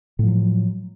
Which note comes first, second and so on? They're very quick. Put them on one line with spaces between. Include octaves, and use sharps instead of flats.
A2 F3 F#3